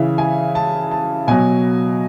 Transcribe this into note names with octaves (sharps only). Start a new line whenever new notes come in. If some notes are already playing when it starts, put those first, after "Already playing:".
Already playing: C#3 E3 E5
G#5
A5
A5
B2 F#3 G#5